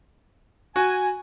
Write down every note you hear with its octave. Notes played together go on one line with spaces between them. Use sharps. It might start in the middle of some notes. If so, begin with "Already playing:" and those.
F#4 G#5